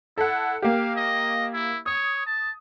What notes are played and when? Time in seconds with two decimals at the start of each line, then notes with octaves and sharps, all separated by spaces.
0.18 E4 A4 F#5
0.62 A#3 G4 F5
0.96 D#5
1.53 E4
1.86 C#5 D#6
2.27 A5